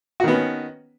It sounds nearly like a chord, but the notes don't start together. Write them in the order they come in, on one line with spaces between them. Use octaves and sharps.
F#4 D#3 B3 C#4